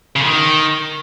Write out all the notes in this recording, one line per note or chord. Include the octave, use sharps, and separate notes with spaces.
C#3
D3
D#3